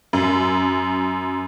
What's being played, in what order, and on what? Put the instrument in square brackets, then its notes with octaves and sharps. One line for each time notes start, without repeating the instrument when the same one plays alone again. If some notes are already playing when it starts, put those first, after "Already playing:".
[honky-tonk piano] F#2